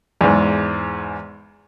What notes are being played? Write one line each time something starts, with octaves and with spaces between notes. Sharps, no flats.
E2 G#2